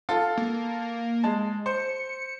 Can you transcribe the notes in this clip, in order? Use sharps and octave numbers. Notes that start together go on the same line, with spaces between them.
F4 A4
A#3
G#3 A5
C5 C#7